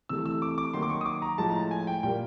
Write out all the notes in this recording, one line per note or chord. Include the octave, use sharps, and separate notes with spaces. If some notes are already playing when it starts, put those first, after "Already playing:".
C3 E3 A3 E6
E6
D6
D6
D#3 F#3 A#3 C6
D6
C#6
D#6
D6
A#5
A2 F3 G#3 A5
A#5
A5
G#5
G5
A#2 G3 A#3 G5